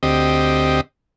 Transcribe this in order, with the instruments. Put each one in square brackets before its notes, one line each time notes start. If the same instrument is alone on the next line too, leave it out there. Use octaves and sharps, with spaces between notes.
[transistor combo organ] D2 C4 G4 D#5